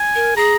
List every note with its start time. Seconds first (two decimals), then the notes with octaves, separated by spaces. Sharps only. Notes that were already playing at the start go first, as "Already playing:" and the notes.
Already playing: G#5
0.15 A#4
0.36 G#4 A#5